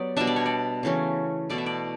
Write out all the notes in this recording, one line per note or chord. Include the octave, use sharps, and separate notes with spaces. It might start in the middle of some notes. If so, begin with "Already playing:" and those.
Already playing: F#3 B3 G4 D5
B2 G3 D4 E5
D5
C#5
D5
C#3 E3 A3 C#4
B2 A3 E4 D5
E5
D5